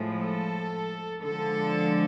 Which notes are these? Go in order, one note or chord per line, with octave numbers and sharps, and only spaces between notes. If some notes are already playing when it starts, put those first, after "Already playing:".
Already playing: A2 F3 G#3
A4
D3 F3 G#3 A4